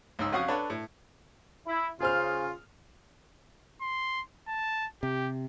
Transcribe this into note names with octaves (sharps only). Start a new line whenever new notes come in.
C#2 G#2 E6
F2 C#4 F#4 F5 C#6 D#6
D4 A4 B4 C#5
A2
E4
C#3 F4 G#4 C5 F6
C6
A5
C3 G4